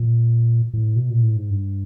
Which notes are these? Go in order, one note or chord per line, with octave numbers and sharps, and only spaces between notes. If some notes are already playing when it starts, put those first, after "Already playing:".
Already playing: A#2
A2
B2
A#2
A2
G#2
G2